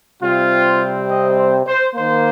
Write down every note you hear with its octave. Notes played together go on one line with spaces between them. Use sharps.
C3 G3 C4 F4
D#5
C5
C5
D#3 A#3 C5